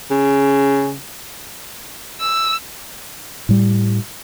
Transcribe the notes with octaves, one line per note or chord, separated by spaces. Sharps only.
C#3
E6
A2 G3